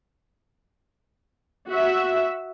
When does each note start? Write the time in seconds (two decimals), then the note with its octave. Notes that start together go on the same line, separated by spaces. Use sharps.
1.69 F#4 E5